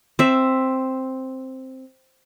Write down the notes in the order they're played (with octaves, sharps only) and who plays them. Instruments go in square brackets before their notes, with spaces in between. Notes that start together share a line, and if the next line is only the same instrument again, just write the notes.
[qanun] C4 E5